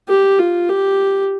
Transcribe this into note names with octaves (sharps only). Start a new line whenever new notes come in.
G4
F4
G4